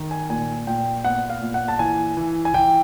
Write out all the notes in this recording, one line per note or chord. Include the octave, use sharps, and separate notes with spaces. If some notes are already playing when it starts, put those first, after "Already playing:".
Already playing: D#3
G#5
A#2 G#5
A#2 G5
B3 F#5
F5
A#2
F#5
A5
E3 G#5
E3
G#5
E3 G5